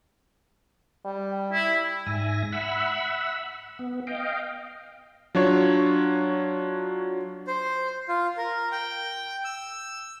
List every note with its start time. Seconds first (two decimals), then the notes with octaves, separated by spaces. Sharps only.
1.05 G3
1.53 E4
2.06 G#2 E5 G#5 A#6
2.52 E5 F#5 B5 E6
3.79 B3
4.07 D#5 F5 G5
5.35 F#3 D4 F4 C#5
7.47 C5
8.09 F4
8.37 A#4
8.72 G5
9.44 E6